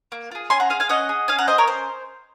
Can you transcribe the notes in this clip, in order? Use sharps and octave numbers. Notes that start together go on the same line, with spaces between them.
A#3
F4 G#4
C#4 G#5 C6
F#5 A#5
G#4 F5 G#5
F5 G#5
C#4 D#5 F#5
G#4
C#4 F5 G#5
F#5 A#5
G#4 C5 D#5
A#4 C#5
C#4 C5